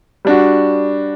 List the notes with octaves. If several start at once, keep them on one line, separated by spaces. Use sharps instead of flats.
G3 D4 F#4